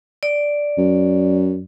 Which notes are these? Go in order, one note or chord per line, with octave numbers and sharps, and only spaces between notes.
D5
F#2